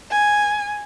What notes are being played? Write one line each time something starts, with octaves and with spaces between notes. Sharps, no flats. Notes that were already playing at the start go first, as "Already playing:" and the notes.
G#5